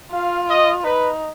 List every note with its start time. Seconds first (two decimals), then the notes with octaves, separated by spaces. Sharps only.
0.13 F4 F5
0.49 D#5
0.84 D#4 B4